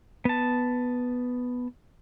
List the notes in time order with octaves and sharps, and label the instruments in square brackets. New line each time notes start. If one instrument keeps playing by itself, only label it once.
[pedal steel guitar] B3 A5